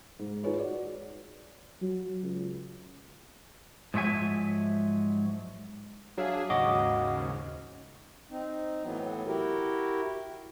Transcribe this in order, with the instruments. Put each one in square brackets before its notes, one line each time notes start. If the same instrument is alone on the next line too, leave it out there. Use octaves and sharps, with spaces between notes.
[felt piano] G#2
D#4 F4 G#4 B4 C#5
F#4 D5
[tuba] F#3
C#2
[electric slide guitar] G#2 F3 F#3 E5 G#5
[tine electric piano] F#3 F5 [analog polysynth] D4 G#4 E5
[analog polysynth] D#2 G#2 C#3 [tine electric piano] F#4 D#5 D6
[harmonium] C4 D#4
A2 E3 F#3 B3
E4 F#4 G4 A#4